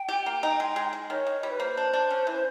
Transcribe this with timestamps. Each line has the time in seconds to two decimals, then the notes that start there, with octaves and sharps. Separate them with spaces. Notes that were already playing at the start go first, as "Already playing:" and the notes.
Already playing: G5
0.09 G4
0.26 A#3
0.43 D#4
0.60 G#3
0.76 G#3
0.93 G#3
1.10 D#3 C#5
1.27 D#3
1.43 G3
1.50 B4
1.60 A#3 C5
1.77 D4
1.93 D4
2.10 C#4
2.27 E3